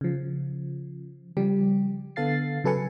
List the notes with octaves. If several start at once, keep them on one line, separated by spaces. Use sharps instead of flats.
C#3 F3
C#3 F3 G3 G4
D3 B3 A4 F5 A6 C7
C#3 F#3 A4 B4 G#5 C#7